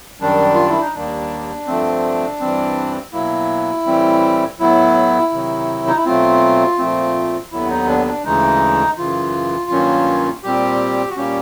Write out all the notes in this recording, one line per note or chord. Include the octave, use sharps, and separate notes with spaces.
F#2 D#3 G3 D4
F4
E4
D#4
D#2 D#3 G3 A#3 D4
G2 D3 F3 A3 C4
G2 E3 G3 C4
B2 F#3 A#3 E4
A2 E3 G3 C4
A2 F#3 B3 E4
C3 D#3 F#3
D#4
E4
B2 F#3 A3 C4 F4
A#2 F3 A3 C4
D#2 D3 F#3 B3 E4
D#4
D4
D4
D2 C#3 E3 G#3 D#4
F#2 C#3 E3 F4
G2 D#3 F#3 A#3 C#4
A#2 G3 C4 G4
F#4
A#2 G3 A#3 C#4 G4